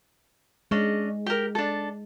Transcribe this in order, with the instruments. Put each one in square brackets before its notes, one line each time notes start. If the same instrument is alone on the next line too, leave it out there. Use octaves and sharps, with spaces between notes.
[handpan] G#3 [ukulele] C#4 D4 D#5
[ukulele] G4 A#4
D4 A4